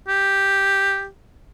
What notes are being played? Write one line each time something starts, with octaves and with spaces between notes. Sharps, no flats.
G4